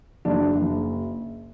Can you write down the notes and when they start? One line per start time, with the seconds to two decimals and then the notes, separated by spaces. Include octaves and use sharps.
0.25 F#1 D4
0.54 F#1